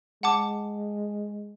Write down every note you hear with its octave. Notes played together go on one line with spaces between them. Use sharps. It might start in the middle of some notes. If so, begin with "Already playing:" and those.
G#3 F#5 A5 D6